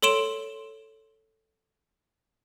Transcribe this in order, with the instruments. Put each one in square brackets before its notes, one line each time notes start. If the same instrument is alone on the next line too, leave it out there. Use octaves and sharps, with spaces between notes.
[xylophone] A4 C#5 C6 D7 E7